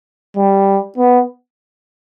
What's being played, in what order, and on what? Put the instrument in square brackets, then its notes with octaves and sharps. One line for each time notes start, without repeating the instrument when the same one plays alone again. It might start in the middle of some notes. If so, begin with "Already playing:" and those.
[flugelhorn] G3
B3